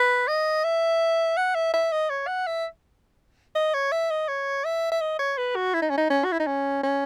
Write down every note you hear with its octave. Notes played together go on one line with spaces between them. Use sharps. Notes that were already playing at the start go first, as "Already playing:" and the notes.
Already playing: B4
D#5
E5
F#5
E5
E5
D#5
C#5
F#5
E5
D#5
C#5
E5
D#5
C#5
E5
E5
D#5
C#5
B4
F#4
E4
D#4
C#4
D#4
C#4
F#4
E4
D#4
C#4
C#4